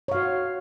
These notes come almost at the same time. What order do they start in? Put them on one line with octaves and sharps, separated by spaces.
C#5 F5 F#4